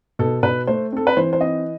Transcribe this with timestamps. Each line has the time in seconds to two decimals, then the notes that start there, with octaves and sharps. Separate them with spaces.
0.19 B2 A4
0.43 B2 B4
0.67 A3 C5
0.92 C4 A4
1.07 B4
1.17 E3 C5
1.33 C5
1.41 C4 D#5